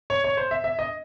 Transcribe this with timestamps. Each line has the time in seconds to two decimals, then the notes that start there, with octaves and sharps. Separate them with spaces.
0.10 C#5
0.24 C#5
0.37 C5
0.51 E5
0.64 E5
0.79 D#5